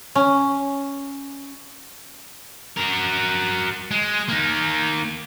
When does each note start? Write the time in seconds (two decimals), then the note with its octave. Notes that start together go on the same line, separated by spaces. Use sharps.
0.15 C#4
2.77 F#4 A#4
3.91 G#3
4.29 A#3 D#4